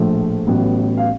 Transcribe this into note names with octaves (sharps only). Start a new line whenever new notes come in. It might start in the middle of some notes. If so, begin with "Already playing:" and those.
Already playing: A#1 A2 F3 A3
A1 A2 F#3 B3
F5